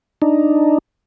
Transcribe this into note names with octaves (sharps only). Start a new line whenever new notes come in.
D4 D#4